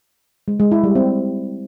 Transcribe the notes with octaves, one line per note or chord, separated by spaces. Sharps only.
G#3
G#3
E4
G3
C4